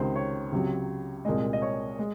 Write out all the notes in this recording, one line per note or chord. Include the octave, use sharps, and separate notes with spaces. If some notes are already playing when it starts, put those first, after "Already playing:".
Already playing: C#2 C3 D#3 G#3 C5
C#5
C#2 C3 F#3
C2 A#2 G#3 D#5
D#5
C#5
G#3